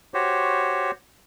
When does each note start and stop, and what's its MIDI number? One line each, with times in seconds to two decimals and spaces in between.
0.14 0.91 66
0.14 0.91 67
0.14 0.91 72
0.14 0.91 73